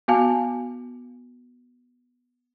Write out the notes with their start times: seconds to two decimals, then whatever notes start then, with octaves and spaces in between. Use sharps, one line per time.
0.08 B3 F#4 F5 G#5 A5